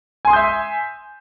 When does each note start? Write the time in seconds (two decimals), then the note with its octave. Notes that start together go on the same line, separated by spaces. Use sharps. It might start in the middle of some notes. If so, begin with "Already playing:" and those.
0.25 G#5
0.27 C6
0.30 D#6
0.33 G6
0.36 E5